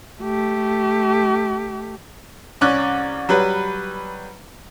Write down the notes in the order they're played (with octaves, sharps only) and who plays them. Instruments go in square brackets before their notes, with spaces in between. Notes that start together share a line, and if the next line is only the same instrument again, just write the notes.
[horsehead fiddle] A3 G4
[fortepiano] C2 C#4 D5 F#6
F#3 G3 B4